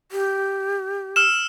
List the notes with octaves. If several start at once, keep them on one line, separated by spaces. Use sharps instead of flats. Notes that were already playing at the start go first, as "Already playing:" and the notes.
G4
E6 F6 E7